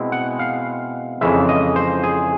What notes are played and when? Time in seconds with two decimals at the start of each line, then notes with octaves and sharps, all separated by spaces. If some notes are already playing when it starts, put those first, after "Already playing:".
Already playing: B2 G#3 C4 E4
0.12 F#5
0.39 F5
1.21 F2 C#3 E3 G#3 E5
1.49 D#5
1.76 C5
2.03 G#4